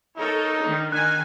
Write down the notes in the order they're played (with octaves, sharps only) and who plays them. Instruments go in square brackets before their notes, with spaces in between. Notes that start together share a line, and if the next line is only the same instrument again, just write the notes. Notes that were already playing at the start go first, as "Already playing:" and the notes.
[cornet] D#4 [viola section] A4 A#4 C#5
[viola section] D#3 D4
[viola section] D#3 G#5 [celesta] F#6